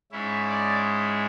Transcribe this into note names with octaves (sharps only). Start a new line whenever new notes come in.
G#2 G#3 C#4 E4 E5
D5